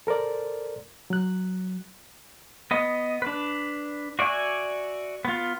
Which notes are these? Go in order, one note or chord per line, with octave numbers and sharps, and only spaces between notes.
A4 A#4 C5 D5
F#3 F#6
B3 D#5
D4 B4
F#4 D5 E5 G#5
B3 F4